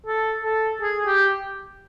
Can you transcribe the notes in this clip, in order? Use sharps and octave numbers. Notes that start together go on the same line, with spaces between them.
A4
A4
G#4
G4